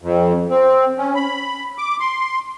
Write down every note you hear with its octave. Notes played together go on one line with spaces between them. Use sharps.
F2
C4
C#4
B5
D6
C6